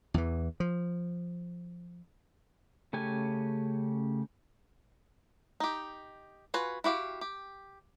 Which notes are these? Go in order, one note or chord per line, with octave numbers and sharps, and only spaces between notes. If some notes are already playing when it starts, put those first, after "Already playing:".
E2 E3
F3
C#3 A3 C#4 G4 G#5
D#4 G4
F4 F#4 B4 G#5
E4 F#4 G4 F5
G4